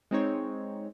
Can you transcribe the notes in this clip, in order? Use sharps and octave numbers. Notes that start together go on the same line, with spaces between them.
G#3 C4 D#4 C#5